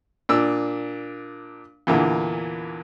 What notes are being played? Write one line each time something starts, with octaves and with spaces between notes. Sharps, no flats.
A#2 D4 E6
E2 A#2 D3 E3